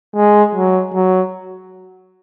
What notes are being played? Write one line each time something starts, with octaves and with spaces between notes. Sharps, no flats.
G#3
F#3
F#3